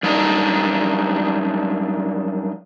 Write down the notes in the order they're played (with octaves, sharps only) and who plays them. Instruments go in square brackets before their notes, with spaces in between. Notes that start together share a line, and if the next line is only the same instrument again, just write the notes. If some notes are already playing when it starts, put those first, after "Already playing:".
[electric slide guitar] F#2 G3 D4 D#4 D#5